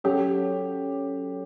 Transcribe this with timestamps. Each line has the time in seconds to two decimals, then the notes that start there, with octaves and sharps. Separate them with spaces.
0.04 F#3 C#4 F#4 G4 A4 C#5